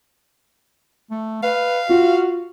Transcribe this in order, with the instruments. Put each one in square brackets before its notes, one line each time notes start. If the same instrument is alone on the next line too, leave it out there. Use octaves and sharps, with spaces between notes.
[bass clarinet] A3
[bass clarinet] B4 [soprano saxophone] F5
[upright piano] F4 [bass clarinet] F#4